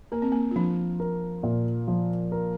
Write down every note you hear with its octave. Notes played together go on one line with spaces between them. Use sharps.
A#3 A#4
C4
A#3
F4
F3 D4
A#4
A#2
F3
A#4